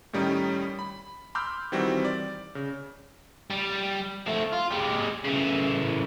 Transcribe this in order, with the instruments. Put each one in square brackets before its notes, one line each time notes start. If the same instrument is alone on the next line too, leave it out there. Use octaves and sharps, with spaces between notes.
[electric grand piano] A2 D#3 G3 C#4 D#4
B5
B5 C6 D6 E6 F6 G6
D#3 E3 G3 C4 F#4
D5
C#3
[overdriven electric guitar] G3
F3 A3
F4
G#3 G4
C#3 E3